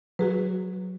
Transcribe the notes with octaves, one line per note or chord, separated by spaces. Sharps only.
F#3 F#4 G#4 B4